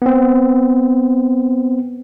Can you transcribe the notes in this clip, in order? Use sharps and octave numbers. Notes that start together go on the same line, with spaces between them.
B3 C4